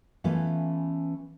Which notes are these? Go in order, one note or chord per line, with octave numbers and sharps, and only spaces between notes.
E3 A3 B3 C#4 F4